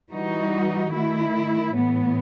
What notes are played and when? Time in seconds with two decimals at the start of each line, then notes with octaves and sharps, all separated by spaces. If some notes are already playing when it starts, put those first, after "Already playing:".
0.10 E3 G3 D#4 F#4
0.92 D#3 A3 E4
1.75 A2 E3 B3